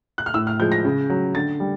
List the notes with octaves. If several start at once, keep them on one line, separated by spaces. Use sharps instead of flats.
F#6
F6
A2 E6
F6
F3 G#3 G6
A#6
C#3
F#3
D3 A6
G3